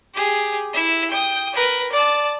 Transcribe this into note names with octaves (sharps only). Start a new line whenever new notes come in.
G4 G#4
E4 E5
G5 D#6
A#4 B4
D5 A5